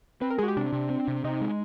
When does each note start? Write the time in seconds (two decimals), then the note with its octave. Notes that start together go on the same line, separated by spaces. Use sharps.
0.21 C4 B4
0.30 A#4
0.38 G#3 F#4 G#4
0.48 G4
0.57 C3 D4
0.73 C3
0.90 C4
1.08 C3
1.24 C3 D#4
1.41 G#3